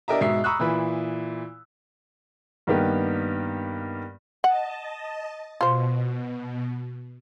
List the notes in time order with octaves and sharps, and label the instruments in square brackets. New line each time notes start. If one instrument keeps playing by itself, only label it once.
[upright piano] D4 G4 A#4 D#5 E5 A#5
G#2 B2 E5 C7
A#5 B5 C#6 D#6 E6 F#6
A#2 E3 E4 B4 B5
G2 D#3 A#3 B3 G4
[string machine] D#5 A5 [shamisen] F#5
[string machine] B2 [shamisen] F4 C5